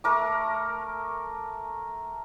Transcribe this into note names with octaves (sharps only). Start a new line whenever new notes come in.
A3 A#4 D6